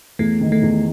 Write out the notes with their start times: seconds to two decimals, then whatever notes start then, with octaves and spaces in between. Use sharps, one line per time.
0.19 E2 A3
0.41 D#3
0.52 A3
0.62 E2